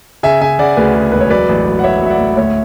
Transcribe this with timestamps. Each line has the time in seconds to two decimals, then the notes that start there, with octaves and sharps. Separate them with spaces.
0.23 C#3 E5 G#5
0.41 C#3 E5 G#5
0.59 C#3 D5 F#5
0.77 D2 G#4 B4
0.95 C#3
1.12 E1 B4
1.21 C#5
1.30 F#3 B4 D5
1.49 A1
1.66 F#3
1.79 F#5
1.83 A1 C#5 E5
2.02 F#3 E5
2.10 D5 F#5
2.20 A2
2.37 D2 C#5 E5